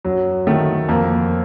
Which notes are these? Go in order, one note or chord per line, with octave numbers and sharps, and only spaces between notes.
F#2 F#3
D#3 A3
F2 A#3